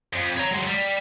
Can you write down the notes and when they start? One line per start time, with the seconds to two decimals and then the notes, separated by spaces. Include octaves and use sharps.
0.13 F2
0.37 C#5 A#5
0.51 F#3 G#3
0.67 G3